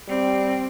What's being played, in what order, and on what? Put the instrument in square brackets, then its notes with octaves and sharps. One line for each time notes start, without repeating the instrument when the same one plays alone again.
[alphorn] G3 [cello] C4